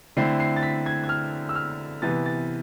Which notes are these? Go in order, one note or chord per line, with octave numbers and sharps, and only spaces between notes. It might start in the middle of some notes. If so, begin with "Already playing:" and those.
D3 A3 C4 E4 C7
C7
A6
B6
G#6
G#6
F6
E6
F6
C3 E3 B3 A6
A6